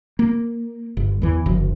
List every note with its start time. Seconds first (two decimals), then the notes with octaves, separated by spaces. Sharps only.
0.19 A#3
0.97 G1
1.22 E2 E3
1.46 F#1 D2 F3